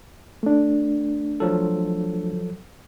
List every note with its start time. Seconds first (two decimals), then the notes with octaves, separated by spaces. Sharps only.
0.43 A3 D4
1.40 F3 F#3 A4